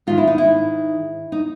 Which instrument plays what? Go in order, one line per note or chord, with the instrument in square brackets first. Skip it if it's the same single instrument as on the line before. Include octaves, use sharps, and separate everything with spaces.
[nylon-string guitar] G#2 D#3 F4
E4
D#4
E4
D#4